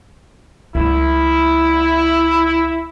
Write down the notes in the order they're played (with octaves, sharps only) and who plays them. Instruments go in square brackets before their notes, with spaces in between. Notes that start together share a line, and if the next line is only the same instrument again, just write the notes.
[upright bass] C#2 A#3 [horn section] E4